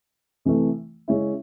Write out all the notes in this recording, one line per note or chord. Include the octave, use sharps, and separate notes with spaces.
C3 E3 A3
C#3 G#3 C#4 E4